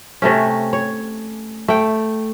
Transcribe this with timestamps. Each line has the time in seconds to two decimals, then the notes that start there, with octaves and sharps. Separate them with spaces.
0.22 C3 A3 C#4
0.73 C#5
1.68 A3 G5